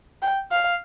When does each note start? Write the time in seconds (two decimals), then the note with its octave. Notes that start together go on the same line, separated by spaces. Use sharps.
0.22 G5
0.51 F5